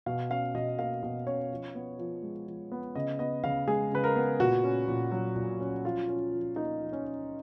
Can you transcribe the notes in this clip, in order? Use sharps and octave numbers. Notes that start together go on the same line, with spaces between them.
B2 F5
C#4 F5
B2 D#5
A#3 F5
B2 D#5
C#4 C#5
F3
B3
F3
G#3
F3
B3
C#3 D#5
B3 D#5
C#3 F5
G#3 G#4
C#3 B4
A#4
B3
A#2 F#4
C#4
A#2
F#3
A#2
C#4
F3 F4
C#4
F3
A#3 D#4
F3
C#4
C#4